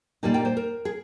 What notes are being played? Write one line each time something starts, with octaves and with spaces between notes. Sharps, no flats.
A#2 G3 A#3 D#4 G#5
G5
C5
A#4
G#4